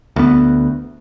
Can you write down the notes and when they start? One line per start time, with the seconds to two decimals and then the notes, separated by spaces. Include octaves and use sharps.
0.16 D2 B3